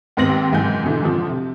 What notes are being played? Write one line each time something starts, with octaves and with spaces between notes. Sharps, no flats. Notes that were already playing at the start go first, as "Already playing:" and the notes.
D#2 G#2 B3 C4 A#6 F#7
F#1 G#2 E3 G#5 G6
G#2 B2 D3 E3
F2 D3 F3
C3